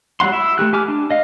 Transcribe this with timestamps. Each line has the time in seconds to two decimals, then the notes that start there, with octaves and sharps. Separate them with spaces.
0.20 F#3 G3 C4 F#5 C6
0.32 E4 E5
0.58 A3 F4 G4 F#6
0.73 G4 G#5 D6 F6
0.88 D4
1.11 D#5 F5